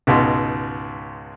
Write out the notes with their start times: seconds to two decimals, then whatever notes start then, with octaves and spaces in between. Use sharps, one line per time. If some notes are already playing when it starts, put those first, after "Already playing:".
0.07 C#2 G#2 B2